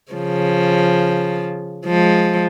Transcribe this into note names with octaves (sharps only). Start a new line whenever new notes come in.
C#3 F3
F3 G#3